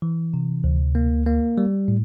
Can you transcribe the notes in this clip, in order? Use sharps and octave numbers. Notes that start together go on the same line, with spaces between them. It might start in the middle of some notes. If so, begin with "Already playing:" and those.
E3
C3
D2
A#3
A#3
G3
A2